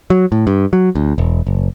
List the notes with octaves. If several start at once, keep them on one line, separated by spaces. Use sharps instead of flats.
F#3
A2
G2
F#3
D2
E1
F#1